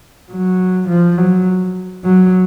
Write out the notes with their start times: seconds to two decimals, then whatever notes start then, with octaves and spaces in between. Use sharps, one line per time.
0.31 F#3
0.88 F3
1.18 F#3
2.05 F#3